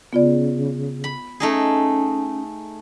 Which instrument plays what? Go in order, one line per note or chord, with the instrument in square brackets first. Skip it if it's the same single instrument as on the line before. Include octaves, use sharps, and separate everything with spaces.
[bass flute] C#3 [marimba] B3 F4 D5
[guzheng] B5
[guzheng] A3 D#4 G#4 [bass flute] C#4